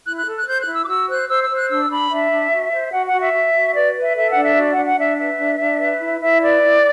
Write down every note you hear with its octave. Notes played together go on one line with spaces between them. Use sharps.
E4 F#6
F#6
A4
F#6
C5 G6
F#6
E4
E6
D6
F#4 E6
C5 F#6
C5 E6
E6
C5
F#6
D4 E6
D4 B5
D4 E5
D4
F#4
C5
F#4 F#5
F#5
F#4
E5
F#4
F#4
B4 D5
B4
E5
A4 E5
F#5
D4
E5
F#4
F#5
D4
F#5
D4 E5
B4 E5
D4
D4
B4
E4
E4 E5
B4 D5
E4